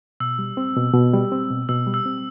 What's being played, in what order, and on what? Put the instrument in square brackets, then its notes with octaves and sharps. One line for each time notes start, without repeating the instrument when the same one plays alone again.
[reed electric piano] B2 [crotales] E6
[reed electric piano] G3
C4
B2
B2
G3
C4
B2
[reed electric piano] B2 [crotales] E6
[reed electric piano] G3
[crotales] E6
[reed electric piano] C4